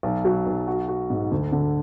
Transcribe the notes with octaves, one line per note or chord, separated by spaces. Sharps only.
B1
F#3
B1
F#4
F#4
G#2
D2
D3